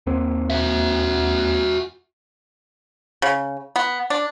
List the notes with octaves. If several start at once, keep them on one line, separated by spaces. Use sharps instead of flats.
D#2 A#3 C4
F#4 E5
C#3
B3
D4